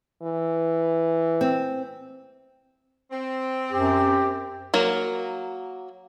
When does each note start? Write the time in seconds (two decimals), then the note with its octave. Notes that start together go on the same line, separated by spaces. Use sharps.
0.22 E3
1.41 C4
3.11 C4
3.72 F#2 G4
4.74 F#3 A#3